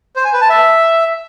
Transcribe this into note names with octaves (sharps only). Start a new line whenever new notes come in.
C5
G#5
B4
A5
E5